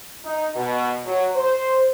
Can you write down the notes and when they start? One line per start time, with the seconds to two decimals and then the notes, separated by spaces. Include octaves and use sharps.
0.24 D#4
0.55 B2
1.05 F#3
1.35 C5